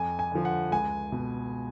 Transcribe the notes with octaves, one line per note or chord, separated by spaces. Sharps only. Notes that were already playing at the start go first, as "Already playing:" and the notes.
Already playing: F2 G#5
G#5
D3 F3
F#5
C#2 G#5
B2